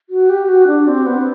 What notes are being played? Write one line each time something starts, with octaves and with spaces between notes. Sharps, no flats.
F#4
G4
F#4
D4
C4
B3